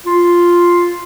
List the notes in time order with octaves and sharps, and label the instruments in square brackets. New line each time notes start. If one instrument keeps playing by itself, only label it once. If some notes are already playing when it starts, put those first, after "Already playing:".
[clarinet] F4